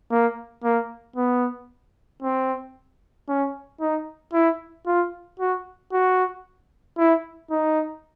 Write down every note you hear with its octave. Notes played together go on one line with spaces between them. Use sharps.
A#3
A#3
B3
C4
C#4
D#4
E4
F4
F#4
F#4
E4
D#4